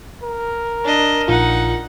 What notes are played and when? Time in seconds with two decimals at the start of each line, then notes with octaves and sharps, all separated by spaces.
0.23 A#4
0.84 D4 D#5
1.28 A#1 D#4 F4 F#5